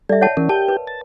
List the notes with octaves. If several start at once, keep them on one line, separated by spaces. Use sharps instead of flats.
G3 A4 D5 E5
C#5 F#5 A5
E3 C#4 A#4
G4 G5 A5
B4
A5